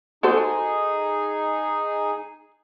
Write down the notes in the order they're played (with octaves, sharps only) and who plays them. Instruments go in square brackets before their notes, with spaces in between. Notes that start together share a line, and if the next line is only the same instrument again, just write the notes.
[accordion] D#4 G#4 G#5 [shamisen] F#4 A4 C5